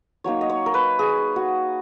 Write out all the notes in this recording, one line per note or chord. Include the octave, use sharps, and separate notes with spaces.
F#3 A#3 D#4 C#5
D#5
C#5
A#4
B4
G#4
F#4